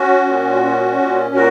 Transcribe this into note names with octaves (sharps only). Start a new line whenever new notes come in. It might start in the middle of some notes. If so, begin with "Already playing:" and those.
Already playing: C#4 F#4
A#2
C#4
A#2
A#2 F#4 A#4